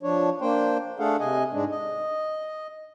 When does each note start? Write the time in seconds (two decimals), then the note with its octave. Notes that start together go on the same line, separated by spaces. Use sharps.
0.03 F3 D4 C#5
0.41 A#3 D4 C5 G5
0.99 A3 D4 G#4 A4 F5 F#5
1.20 C3 D#5 G#5
1.53 G#2 G#3 D4
1.71 D#5